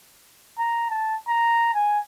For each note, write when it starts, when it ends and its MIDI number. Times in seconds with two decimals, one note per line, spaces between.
0.59 0.89 82
0.90 1.16 81
1.28 1.71 82
1.74 1.99 80